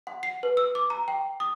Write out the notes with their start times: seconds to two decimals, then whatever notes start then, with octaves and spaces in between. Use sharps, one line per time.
0.07 F#5
0.23 C7
0.43 B4
0.57 E6
0.75 D6
0.90 A#5
1.08 G5
1.40 D#6